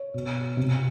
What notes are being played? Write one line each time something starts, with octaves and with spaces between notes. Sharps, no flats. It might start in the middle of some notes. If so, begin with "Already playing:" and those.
Already playing: C#5
B2
C3